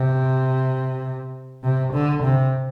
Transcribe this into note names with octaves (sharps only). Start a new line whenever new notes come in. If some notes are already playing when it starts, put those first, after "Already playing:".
Already playing: C3
C3
D3
C3